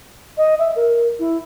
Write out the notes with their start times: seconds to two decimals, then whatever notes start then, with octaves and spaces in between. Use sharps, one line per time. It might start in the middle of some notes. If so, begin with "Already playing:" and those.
0.38 D#5
0.59 E5
0.76 A#4
1.19 E4